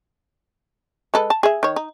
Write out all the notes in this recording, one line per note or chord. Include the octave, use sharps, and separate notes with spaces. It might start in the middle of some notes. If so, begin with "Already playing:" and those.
G#3 A4 B4
A5
G#4 E5
D#3 C#5
D#4